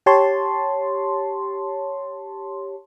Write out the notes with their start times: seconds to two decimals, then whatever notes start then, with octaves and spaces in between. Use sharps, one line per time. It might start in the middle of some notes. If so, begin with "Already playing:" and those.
0.06 G4 C#5 A5 C6